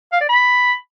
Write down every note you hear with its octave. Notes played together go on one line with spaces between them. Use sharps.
F5
D5
B5